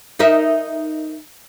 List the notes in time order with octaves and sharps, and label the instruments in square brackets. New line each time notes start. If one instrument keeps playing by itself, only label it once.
[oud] D#4 A#4 E5